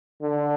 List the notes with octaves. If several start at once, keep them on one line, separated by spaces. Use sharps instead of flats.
D3